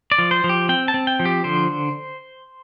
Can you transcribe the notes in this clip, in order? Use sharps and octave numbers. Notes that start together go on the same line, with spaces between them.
D5
F3
C5
F3
G4
C4 G5
A5
C4
G5
F3
G4
D3 C5